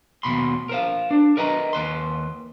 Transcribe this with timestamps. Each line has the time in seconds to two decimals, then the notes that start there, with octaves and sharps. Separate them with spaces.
0.23 D#2 G#2 B2 B5 C6
0.69 A#4 C5 F5
1.11 D4
1.37 A#4 B4 D#5 A#5
1.73 D#2 B4 C6